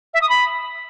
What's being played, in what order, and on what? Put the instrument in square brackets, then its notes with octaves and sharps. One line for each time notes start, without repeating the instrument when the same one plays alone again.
[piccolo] E5
D#6
B5